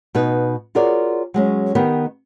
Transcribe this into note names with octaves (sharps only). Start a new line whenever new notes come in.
B2 D#4 B4
F4 F#4 G#4 A#4 C#5 D5
F#3 G#3 C#4
D#3 B3 G4 A#4